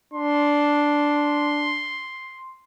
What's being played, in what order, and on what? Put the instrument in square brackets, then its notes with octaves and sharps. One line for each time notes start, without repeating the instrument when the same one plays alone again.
[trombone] D4 [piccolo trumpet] C6